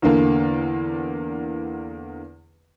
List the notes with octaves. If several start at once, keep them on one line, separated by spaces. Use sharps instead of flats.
E2 D3 A#3